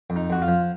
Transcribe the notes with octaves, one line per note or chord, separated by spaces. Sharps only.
F2
D#4
F2 F#4
F4
F3